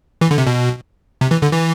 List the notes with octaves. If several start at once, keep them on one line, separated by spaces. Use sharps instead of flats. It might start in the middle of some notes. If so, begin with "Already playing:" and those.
E3
D3
C3
B2
C3
E3
D3
E3